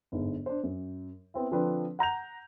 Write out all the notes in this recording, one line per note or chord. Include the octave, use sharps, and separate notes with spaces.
G1 G#2
D4 C5
F#2
B3 C4 E4
D3 F3 C4 D4 F4 B4
F#5 A#5 G6 F7